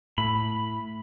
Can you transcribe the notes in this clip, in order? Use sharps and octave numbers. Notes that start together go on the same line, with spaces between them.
A2 B5